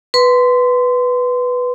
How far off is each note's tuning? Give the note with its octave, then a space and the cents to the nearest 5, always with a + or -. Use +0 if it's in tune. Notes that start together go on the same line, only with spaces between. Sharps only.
B4 +0 C6 -20